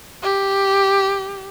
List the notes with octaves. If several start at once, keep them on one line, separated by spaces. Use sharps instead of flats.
G4